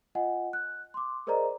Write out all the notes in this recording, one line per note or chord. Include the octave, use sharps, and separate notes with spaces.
F4 D#5 F#5 G#5
F#6
C6 D6
G#4 A#4 C5 D5 D#5 A#5